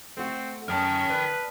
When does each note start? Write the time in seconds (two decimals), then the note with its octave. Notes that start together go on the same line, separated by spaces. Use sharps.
0.17 A3 C4 F#4
0.68 F#2 C#3 A#4 G5 A5 D#6 F6
1.10 B4 D5